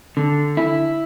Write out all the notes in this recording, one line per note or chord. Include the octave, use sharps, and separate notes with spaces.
D3
E4